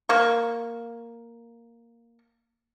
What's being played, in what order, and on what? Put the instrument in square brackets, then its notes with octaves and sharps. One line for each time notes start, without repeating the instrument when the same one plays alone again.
[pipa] A#3 C#6